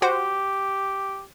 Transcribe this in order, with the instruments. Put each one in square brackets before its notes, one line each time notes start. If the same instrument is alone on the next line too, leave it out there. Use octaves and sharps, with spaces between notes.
[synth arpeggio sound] F#4 C5 F#5 [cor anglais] G4